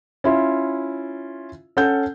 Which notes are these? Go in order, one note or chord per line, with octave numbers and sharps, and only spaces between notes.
C#4 E4 F4
C#4 A4 F#5 G6